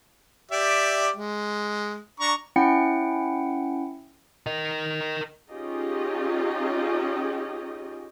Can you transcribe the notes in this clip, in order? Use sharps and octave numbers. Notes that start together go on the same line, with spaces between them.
G4 D5 E5
G#3
D4 A#5 C#6
C#4 E4 F#5 G5 C#7
A#4 D#5
C#4 D#4 F4 G4 G#4 D#5